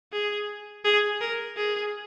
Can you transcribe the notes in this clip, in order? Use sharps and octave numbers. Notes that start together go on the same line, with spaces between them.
G#4
G#4
A#4
G#4